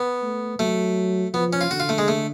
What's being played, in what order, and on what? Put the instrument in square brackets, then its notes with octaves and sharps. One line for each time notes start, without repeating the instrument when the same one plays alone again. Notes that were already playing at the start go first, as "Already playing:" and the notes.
Already playing: [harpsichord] B3
[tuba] A3
[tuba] F#3 [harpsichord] A3
[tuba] F3 [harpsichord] B3
[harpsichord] C#4
F4
[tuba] D3 [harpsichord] F#4
[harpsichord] F4
A3
G#3
A3